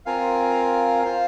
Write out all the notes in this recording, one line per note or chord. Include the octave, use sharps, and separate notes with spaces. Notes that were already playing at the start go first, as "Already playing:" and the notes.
C4 F4 A#4 F5 G#5
F4 C5 F5